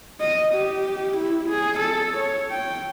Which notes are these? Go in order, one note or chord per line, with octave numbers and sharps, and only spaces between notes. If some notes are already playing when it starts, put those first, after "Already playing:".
D#5
G4
E4
G#4
A4
C#5
G5